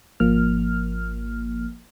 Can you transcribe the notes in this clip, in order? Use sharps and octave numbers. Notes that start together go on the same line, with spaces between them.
G#1 F3 A#3 F6